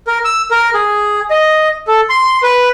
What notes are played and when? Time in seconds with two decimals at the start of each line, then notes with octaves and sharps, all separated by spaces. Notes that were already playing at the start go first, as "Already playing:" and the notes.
0.07 A#4
0.25 E6
0.51 A#4
0.74 G#4
1.30 D#5
1.87 A4
2.09 C6
2.43 B4